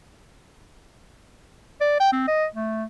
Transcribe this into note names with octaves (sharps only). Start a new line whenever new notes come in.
D5
G5
C4
D#5
A3